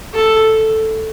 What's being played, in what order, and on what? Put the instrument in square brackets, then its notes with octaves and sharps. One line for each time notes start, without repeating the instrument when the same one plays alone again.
[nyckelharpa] A4